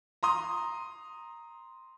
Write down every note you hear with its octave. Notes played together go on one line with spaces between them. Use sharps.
A#5 C6 D#6